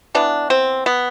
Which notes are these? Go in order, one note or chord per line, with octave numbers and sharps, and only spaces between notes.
E3 B3 D4
C4
B3